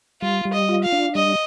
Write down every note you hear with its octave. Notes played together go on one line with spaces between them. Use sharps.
G3 F4
G3
D#5
F4
F5
D4
G3 D#5